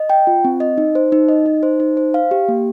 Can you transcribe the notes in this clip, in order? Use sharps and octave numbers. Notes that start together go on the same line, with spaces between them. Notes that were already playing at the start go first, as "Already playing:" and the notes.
Already playing: D#5
G5
F4
C4
D#5
D#4
C5
D#4
D#5
D#4
C5
D#4
C5
F5
G4
A#3